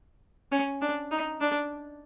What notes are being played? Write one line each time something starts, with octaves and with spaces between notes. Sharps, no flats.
C#4
D4
D#4
D4